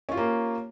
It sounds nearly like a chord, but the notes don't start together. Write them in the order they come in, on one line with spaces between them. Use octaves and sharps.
C#4 F4 G4 A#3